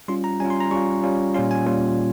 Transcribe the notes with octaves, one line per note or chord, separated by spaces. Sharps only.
G3 C#4 F4 C6
A#5
G3 C#4 F4 G#5
C6
A#5
G3 C#4 F4 C#6
G3 C#4 F4
A#2 G3 C#4 F4 C6
G#5
A#2 G3 C#4 F4